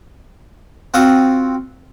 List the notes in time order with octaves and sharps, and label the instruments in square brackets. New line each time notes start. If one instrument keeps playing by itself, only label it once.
[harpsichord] C4 F4 F#4 D#6